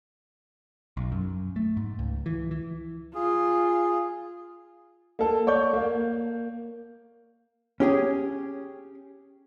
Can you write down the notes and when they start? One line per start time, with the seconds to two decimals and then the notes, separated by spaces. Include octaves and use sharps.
0.97 B1
1.12 F#2
1.56 A3
1.77 G#2
1.99 C#2
2.26 E3
2.51 E3
3.14 F4 G#4
5.19 A#3 A4
5.47 C#5 D5 C#6 G6
5.73 A#3 F5
7.80 C#4 G4 G#4